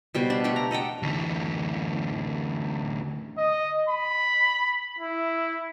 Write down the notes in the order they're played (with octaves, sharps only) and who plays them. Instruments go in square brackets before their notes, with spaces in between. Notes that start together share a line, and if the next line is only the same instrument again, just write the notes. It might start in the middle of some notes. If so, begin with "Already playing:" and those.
[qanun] B2 G3 C5
D4
A3 D4 G4
A#5
A4 D#5 F#5 G5
[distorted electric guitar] D2 E3
[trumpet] D#5
B5
E4